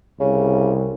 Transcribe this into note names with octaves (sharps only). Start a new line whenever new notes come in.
C2 C#3